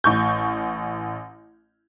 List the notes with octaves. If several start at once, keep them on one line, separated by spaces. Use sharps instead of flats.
A1 C#6 G6